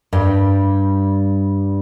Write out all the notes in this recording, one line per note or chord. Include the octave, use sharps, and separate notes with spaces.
G2 G3